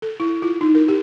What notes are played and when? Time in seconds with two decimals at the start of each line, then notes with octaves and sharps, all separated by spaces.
0.02 A4
0.20 E4
0.42 F4
0.61 D#4
0.75 A#4
0.88 G4